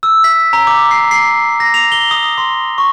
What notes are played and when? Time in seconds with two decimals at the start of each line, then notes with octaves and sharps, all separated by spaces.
0.03 E6
0.24 B6
0.53 A#5
0.67 D6
0.91 C7
1.11 C7
1.60 A#6
1.74 F7
1.92 G7
2.11 D#6
2.38 C6
2.78 C#6